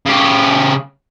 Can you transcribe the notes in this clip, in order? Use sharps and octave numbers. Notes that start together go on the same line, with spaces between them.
C#3 G4